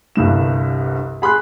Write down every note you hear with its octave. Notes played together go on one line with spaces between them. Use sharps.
G1 C2 G2 E7
G#4 B5 C6 F#6